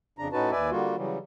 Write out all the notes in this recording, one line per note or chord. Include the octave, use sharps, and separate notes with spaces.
F2 C#3 D4 A#5
A2 C#4 D#4 F#4 B4 A5
D#2 B4 D5 E5 G#5
D3 G3 A#3 F4 F#4
C#3 E3 F#3 G3